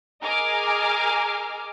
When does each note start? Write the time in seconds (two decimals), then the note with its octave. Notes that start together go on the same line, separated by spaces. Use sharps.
0.22 G#4 A#4 D#5 G#5 D6 F6